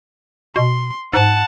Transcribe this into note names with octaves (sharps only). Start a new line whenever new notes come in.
B2 C6
G#2 F#5 A5